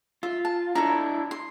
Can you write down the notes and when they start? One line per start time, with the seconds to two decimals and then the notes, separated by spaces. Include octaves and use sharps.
0.23 F4 E5
0.45 A5
0.75 D4 E4 A4 A#5
1.31 C6